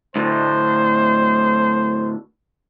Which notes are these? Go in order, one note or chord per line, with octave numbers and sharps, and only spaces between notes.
D2 A2 D3 C5